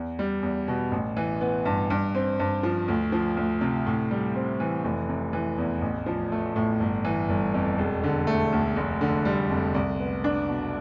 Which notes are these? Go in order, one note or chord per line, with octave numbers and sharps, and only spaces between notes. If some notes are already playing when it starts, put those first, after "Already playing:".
Already playing: E2
G3
E2
B2
A1
E3
B3
G2
G2
C4
G2
F3
D2
F3
D2
C3
A2
G3
C4
E3
F1
C3
E3
E2
A1
F3
A3
A2
G1
E3
G1
F2
E1
D3
A3
D2
F1
D3
G3
F2
C2
B3
D4
B2